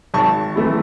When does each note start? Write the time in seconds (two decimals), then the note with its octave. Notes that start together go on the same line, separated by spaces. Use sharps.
0.14 G#1 A5 C#6
0.56 E3 A3 E4